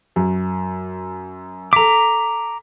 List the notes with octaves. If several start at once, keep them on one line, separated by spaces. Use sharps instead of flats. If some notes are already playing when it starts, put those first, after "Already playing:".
F#2
A4 A#5 D6 B6